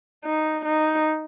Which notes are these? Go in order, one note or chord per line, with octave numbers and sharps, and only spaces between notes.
D#4
D#4